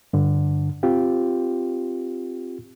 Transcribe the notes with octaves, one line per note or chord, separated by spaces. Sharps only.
G2 D3
C4 F4 G4